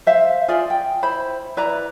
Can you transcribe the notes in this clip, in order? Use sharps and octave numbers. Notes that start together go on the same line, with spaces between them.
C5 E5 F5
F4 G#4 D5 G#5
G5
E4 C5 B5
E4 B4 D5 A#5